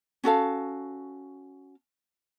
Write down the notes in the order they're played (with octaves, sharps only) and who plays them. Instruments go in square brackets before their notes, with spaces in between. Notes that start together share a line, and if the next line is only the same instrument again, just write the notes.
[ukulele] C#4 F#4 A4 F5